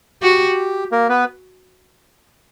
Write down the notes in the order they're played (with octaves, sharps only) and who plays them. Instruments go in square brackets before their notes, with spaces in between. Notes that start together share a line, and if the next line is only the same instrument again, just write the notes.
[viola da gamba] F#4 [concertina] G4
[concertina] A#3 A#4
B3 B4